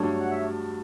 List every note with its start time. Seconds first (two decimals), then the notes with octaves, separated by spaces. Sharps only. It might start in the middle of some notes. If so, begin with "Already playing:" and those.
Already playing: G2 F#3 A3 D4 C#5
0.20 F#5
0.31 E5